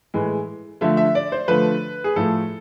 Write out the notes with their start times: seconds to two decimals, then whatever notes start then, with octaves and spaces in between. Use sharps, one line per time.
0.14 A2 E3 G#3
0.81 D3 F3 A3 E5
0.97 E5
1.15 D5
1.32 C5
1.48 D3 F3 A3 B4
2.04 G#4
2.16 A2 F3 A3 A4